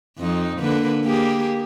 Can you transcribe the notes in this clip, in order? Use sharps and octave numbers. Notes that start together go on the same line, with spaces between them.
F2 F3 D#4
D3 A#3 B4
A#3 G4 G#4